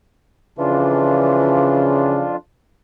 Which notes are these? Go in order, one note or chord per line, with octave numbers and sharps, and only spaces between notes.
F2 C#3 E3 D4 F4